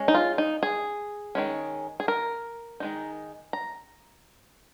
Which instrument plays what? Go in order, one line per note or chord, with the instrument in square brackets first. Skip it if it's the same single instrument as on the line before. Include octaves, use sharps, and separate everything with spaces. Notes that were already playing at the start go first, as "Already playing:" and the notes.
Already playing: [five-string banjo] G#3 C#4
D#4
F4
D#4
G#4
D#3 G#3 C#4
G#4
A#4
D#3 G#3 D#4
A#5